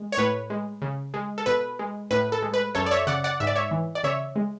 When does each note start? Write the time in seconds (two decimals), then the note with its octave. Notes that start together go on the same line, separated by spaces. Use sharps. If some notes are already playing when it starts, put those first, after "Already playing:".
Already playing: G#3
0.12 C#5
0.18 A2 B4
0.50 G#3
0.82 C#3
1.14 G#3
1.38 A4
1.46 B2 B4
1.79 G#3
2.11 A2 B4
2.32 A4
2.42 G#3
2.54 B4
2.75 F#2 A4 C#5
2.86 D5
2.91 C#5 E5
3.07 C#3 D5 F#5
3.24 D5 F#5
3.40 G#2 E5
3.47 D5
3.56 C#5 E5
3.71 E3
3.95 D5
4.03 C#3 C#5 E5
4.36 G#3